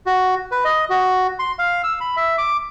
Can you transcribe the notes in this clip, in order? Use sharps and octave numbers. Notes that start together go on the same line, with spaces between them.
F#4
B4
D#5
F#4
C6
F5
E6
B5
E5
D6